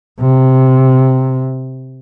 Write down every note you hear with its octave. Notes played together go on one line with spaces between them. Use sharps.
C3